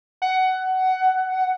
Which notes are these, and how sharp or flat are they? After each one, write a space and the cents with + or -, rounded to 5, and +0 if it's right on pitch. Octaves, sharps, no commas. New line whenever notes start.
F#5 +15